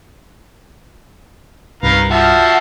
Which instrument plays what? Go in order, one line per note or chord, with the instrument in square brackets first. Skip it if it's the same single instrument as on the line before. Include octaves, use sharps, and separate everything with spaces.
[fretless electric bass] C2 G2 [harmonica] D#3 F5 A#5 [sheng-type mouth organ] B4
[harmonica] F3 [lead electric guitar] F#4 [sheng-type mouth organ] E5 A5